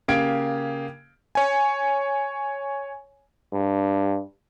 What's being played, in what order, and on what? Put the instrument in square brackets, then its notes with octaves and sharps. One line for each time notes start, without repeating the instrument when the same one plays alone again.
[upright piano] C#3 A#3 G4 F5 G#6 D7
[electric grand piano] C#5 G#5
[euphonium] G2